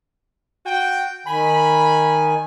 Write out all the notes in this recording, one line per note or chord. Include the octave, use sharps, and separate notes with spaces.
F#4 G5
D#3 G#5 B5